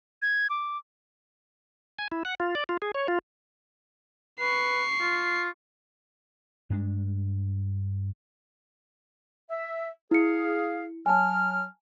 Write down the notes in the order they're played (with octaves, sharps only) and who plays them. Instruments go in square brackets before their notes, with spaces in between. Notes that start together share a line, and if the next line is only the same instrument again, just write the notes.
[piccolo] G#6
D6
[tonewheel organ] G#5
E4
F#5
F4
D5
F4
G#4
C#5
F4
[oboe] B4 [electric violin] C#6 C7
[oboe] F4
[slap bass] G2 G#3 D4
[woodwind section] E5
[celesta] E4 C#7 [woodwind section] G#4 F5
[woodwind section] F#3 F6 [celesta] G#5 A5